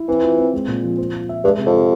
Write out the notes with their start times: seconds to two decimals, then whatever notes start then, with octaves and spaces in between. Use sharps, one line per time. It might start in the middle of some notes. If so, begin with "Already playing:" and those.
Already playing: E4
0.08 E3 C4
0.23 F4
0.38 C4
0.54 G#3
0.68 A#2
0.84 F3
0.98 C5
1.14 F4
1.29 E5
1.44 G2 G#3
1.59 C3
1.66 F2
1.74 C3